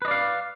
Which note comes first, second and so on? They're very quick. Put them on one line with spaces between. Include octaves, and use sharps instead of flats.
B4 D#5 D5 F5